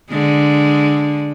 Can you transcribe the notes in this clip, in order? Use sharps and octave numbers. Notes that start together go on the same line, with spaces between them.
D3 G#3